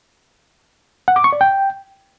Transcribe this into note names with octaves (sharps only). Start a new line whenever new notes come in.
F#5
D6
C#6
D5
G5